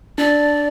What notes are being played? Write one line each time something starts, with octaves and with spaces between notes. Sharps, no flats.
D4 D5